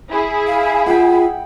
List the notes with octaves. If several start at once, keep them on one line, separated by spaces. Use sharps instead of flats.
E4 G#4
F5
F4 F#5 G5